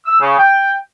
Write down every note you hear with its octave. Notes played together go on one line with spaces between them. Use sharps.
E6
C#3
G5